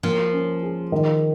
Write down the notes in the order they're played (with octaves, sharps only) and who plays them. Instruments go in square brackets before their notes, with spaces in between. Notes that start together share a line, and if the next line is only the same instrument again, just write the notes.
[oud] F3 [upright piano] A#3
[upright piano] C#4
G#4
D#3